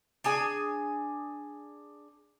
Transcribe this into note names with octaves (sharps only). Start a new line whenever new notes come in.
D4 G#4 G#5